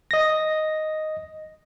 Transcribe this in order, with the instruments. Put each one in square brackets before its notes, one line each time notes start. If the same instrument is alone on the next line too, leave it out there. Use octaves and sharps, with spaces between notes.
[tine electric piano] D#5 A#6